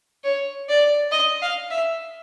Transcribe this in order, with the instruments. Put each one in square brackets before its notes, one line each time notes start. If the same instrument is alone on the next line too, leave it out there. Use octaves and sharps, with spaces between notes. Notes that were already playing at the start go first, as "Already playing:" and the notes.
[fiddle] C#5
D5
D#5
F5
E5